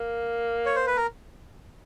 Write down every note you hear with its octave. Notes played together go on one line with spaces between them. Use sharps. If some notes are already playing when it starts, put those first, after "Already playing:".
Already playing: A#3
C#5
C5
B4
A#4